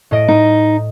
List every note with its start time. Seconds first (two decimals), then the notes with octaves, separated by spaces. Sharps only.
0.11 A2 D#5 D7
0.28 D#4